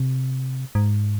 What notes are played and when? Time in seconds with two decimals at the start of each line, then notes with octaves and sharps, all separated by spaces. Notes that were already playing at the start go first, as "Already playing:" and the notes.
Already playing: C3
0.75 G#2